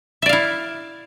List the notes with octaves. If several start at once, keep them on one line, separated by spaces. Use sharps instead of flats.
E4 D5 E5 F5